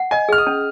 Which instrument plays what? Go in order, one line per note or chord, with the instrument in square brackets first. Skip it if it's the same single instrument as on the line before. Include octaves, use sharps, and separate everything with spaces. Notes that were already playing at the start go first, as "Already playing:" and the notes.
Already playing: [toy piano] F#5
[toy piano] D#5 [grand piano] G#5
[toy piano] G#4 [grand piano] F6
[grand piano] D#6
[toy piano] C#4